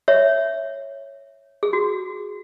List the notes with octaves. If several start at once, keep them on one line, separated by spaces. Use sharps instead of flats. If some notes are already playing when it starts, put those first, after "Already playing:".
C#5 E5
G#4
F#4